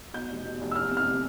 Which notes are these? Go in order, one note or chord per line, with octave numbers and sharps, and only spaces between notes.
B2 G6
F1
B2
F1
E6
E2 F6
C3
F6
C3